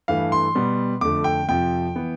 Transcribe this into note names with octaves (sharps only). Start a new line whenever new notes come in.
G2 E3 A3 F5
C6
B2 G3 B3
F2 D3 A3 D6
G5
F2 C3 F3 G5
E3 B3